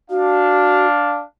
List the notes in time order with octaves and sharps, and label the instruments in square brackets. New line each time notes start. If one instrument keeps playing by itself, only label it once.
[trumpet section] D4 F5 [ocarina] F#4